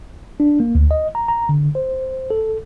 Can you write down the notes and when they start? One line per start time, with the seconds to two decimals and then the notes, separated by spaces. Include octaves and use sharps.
0.40 D4
0.60 A#3
0.75 D2
0.91 D#5
1.15 A#5
1.28 A#5
1.49 D3
1.75 C5
2.30 A4